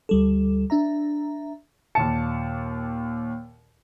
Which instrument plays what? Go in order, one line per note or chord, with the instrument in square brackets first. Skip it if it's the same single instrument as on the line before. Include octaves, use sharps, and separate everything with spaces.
[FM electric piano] D2 G3 A4
D4 E5 A#5
[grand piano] D#2 A#2 C#7 [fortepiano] A5